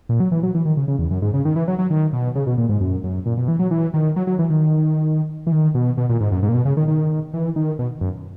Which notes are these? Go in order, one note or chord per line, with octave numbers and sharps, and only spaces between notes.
A#2
F#3
E3
F#3
E3
D#3
C#3
C#3
E2
F#2
G#2
C#3
D#3
E3
F#3
F#3
D#3
B2
C#3
B2
A#2
G#2
F#2
F#2
A#2
B2
E3
F#3
E3
D#3
F#3
F#3
E3
D#3
E3
D#3
B2
B2
A#2
G#2
F#2
G#2
A#2
B2
C#3
D#3
D#3
E3
D#3
B2
F#2